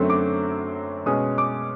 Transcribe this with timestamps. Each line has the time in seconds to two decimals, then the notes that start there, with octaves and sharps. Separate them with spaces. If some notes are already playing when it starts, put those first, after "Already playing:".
Already playing: F#2 D3 F#3 A3 C4
0.10 D6
1.06 B2 G#3 C#4 D#6
1.38 D6